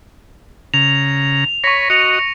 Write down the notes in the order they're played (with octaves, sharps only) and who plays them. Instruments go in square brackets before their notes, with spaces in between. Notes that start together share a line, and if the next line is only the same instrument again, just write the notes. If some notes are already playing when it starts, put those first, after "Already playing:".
[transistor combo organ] C#3 A#5 [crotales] F7
[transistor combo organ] C#5 B5 [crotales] C#6 A#6
[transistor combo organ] F#4 D#5 [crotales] C#7 F7